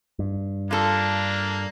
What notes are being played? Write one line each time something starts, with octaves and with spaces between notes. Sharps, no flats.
G2
A#3 D4 F4 A4